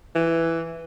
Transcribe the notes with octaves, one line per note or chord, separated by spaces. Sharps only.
E3